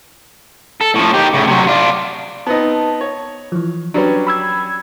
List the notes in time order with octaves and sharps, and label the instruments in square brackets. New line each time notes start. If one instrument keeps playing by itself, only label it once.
[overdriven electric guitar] A4
A2 F3
D#3 G4
A2 C#3
C3 F#3
D4 F4
[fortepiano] B3 C4 D#4 [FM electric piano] A5
[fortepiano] C#5
[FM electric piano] E3 F3
[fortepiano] F#3 G3 C#4 [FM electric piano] D4 B4
[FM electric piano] B5 E6 G#6